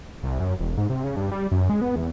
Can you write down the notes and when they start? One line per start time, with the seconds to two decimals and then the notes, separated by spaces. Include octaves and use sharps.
0.24 C2
0.40 F#2
0.59 E1
0.77 G#2
0.90 C3
1.04 C#3
1.16 G2
1.32 G3
1.51 F#2
1.69 G#3
1.81 B3
1.96 E2